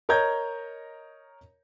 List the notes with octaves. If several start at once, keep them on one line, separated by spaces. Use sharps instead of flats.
A#4 C#5 D#5 A#5 G6 G#6